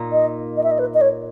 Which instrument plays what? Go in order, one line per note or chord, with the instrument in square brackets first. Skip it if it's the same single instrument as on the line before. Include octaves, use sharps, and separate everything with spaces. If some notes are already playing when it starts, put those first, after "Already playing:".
Already playing: [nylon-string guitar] A#2 A#3 D#4
[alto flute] D#5
D#5
E5
D#5
B4
D#5
C#5